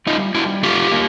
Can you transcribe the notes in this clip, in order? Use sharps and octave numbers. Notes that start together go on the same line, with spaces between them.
G3 D#4 F4
G3 E4 F#4
A#3 F4 G4
A#3